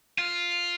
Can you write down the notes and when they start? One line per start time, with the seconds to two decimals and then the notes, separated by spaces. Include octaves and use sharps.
0.18 F4